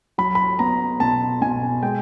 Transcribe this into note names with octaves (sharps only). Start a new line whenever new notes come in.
F#3 B5
B5
B3 A#5
B2 A5
B2 G#5
G#3 G5